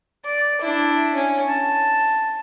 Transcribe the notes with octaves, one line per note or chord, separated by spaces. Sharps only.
D5
D4 E4
C#4
A5